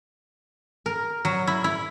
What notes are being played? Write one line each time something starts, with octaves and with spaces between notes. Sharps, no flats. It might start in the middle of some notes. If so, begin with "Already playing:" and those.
A#4
F#3
E4
E4